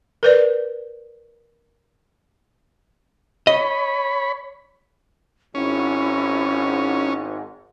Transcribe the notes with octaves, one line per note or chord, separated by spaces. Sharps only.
A#4 B4 D5
C#5 D#5 B5
G#1 G#2 C#4 E4